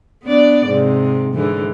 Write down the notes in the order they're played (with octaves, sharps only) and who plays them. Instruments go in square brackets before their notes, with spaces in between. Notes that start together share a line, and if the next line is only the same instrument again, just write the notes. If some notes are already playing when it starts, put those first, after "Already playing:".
[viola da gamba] B3 D4 D5
G#2 C3
G#2 D3 E3